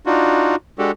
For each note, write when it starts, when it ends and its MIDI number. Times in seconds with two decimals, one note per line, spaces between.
0.06 0.56 62
0.06 0.56 63
0.06 0.56 65
0.06 0.56 66
0.79 0.91 56
0.79 0.91 62
0.79 0.91 66
0.79 0.91 67
0.79 0.91 69